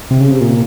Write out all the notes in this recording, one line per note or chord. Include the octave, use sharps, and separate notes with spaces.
C3
C#3
C3
A#2